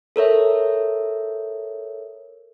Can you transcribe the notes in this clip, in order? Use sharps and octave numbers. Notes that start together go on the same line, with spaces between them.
A4 A#4 C#5 E5